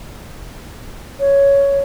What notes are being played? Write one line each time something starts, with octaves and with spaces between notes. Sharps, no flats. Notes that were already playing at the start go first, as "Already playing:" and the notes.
C#5